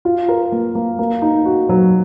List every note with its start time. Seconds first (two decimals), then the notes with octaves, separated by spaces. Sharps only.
0.05 F4
0.28 A#4
0.52 A#3
0.75 A#3
0.99 A#3
1.22 D#4
1.45 F#4
1.69 F#3